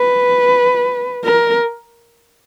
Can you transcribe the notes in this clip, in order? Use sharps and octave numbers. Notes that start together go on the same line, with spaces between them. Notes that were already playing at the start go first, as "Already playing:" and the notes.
Already playing: B4
A#4